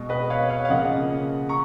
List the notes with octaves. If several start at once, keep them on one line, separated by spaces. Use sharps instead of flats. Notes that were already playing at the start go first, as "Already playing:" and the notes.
Already playing: B2 G#3
B4 D#5
C#5 F5
C#5 F5
F5
C#3 F3 A#3 D#5 F#5
A#5 C#6